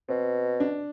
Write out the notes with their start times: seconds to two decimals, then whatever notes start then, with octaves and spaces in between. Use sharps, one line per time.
0.09 B2 C4
0.60 D4